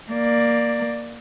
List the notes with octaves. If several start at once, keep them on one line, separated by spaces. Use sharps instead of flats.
A#3 D5